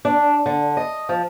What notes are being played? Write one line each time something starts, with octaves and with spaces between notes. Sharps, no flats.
D4
D3
D#5
F3